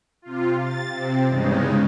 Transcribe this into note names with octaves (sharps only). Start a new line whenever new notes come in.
C3 F4
A6
C3 C4
E2 G2 C#3 G#3 D#4